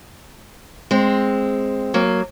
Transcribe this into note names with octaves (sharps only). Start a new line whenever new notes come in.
G#3 C4
F#3 A#3